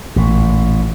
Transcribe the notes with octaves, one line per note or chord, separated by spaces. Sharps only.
A1 A#2